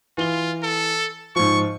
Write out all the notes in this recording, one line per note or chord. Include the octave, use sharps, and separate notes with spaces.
E3 F4 G7
A4
G#2 F3 C#6